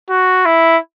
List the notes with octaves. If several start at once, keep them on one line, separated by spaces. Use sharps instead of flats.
F#4
E4